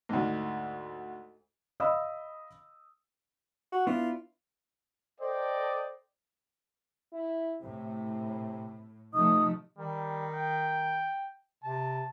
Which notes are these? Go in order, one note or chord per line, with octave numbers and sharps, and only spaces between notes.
D2 G#2
D#5 F5 B5 D#6 E6
F#4
B3 D4 E4 F4
A4 C5 D5 D#5 G5
E4
A2 C3
C3 F3 A3 D#4 D#6
D#3 G3
G5
C3 A5